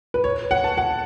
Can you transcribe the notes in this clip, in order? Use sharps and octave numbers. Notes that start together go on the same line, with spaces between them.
B4
C#5
F#5
A5
F#5